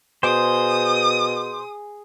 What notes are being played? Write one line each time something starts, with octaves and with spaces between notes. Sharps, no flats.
B2 G#4 C5 D#6